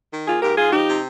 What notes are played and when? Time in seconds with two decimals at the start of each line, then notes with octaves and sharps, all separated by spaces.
0.12 D#3
0.27 A#3 F4 G#4
0.42 G#2 G4 A#4
0.57 G#2 F4 G#4
0.73 F3 D#4 G4
0.89 C3